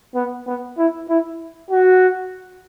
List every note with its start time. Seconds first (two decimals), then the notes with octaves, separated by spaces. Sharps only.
0.15 B3
0.47 B3
0.78 E4
1.09 E4
1.70 F#4